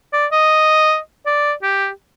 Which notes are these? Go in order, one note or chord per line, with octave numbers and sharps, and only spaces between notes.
D5
D#5
D5
G4